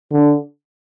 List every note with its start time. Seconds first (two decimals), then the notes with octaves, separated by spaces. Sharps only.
0.12 D3